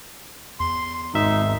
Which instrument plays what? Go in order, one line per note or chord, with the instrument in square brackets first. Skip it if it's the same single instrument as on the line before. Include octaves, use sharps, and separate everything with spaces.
[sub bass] E2 [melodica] C6
[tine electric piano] G#1 E5 [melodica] D#4